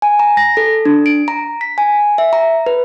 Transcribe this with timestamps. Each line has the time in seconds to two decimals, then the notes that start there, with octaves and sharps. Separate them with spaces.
0.02 G#5
0.19 A#5
0.37 A#6
0.57 A4
0.85 D4
1.06 D7
1.28 A#5
1.61 B6
1.78 G#5
2.18 E5
2.33 A#5
2.66 B4